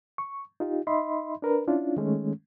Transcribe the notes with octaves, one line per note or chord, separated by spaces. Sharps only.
C#6
D#4 F4 G4
D#4 D#5 E5 B5 C6
D4 A#4 B4
C#4 D4 E4 F4
D#3 G#3 A3 C#4